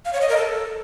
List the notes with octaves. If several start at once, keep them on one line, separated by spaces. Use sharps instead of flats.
F5
C#5
D#5
A#4
A4